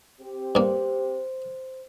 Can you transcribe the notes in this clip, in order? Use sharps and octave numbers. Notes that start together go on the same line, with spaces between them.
C4 G4
G2 A#3 C5